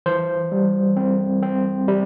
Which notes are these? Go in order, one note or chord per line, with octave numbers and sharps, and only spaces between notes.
E3 C5
G3
C4
C4
G3